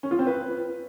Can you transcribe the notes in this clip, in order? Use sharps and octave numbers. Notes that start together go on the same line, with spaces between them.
C#4
F4
C4
B4